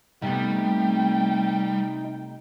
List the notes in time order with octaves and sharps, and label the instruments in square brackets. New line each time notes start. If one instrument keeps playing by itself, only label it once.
[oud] C3 A3 B3 [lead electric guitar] G3 [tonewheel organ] D#4 [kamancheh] G5